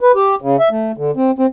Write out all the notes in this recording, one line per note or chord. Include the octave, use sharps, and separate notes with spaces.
B4
G4
C#3
E5
A3
D3
C4
C4